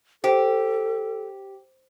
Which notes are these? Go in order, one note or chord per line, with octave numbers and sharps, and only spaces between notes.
G4 A4 C5